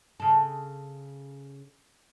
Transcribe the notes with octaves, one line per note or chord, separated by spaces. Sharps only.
C#3 A4